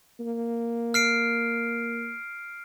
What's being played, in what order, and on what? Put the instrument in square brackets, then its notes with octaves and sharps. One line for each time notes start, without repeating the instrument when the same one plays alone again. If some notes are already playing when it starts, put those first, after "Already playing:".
[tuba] A#3
[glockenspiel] F6 C7 D7